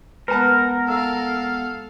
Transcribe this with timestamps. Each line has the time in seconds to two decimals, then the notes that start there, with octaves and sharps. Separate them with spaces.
0.28 G#3 B3 A#4 B4 F#5 A5
0.88 A4 F5 E6